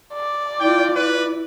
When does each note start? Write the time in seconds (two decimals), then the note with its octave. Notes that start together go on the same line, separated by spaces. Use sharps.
0.13 D5
0.60 E4 F4 G5
0.96 E4 B4